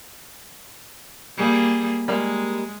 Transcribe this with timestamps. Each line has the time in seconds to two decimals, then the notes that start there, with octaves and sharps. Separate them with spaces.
1.37 G3 A#3 G#4
2.08 G3 G#3 A#3